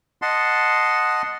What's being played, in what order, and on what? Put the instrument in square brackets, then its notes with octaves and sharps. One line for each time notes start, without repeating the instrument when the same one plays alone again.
[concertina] D#5 F#5 A5 C6